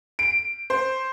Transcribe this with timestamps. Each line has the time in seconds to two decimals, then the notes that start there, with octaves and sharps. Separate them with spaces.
0.19 D7
0.70 C5